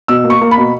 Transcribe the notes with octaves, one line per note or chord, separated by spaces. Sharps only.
B2 E6
A#3
C#6
A#3
B5
B2